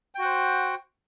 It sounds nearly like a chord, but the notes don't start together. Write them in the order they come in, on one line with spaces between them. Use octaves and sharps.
G5 F#4 F#5 C5